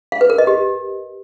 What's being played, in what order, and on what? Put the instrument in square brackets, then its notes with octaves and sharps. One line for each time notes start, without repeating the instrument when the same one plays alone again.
[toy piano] F5
B4
A#4
D#5
G4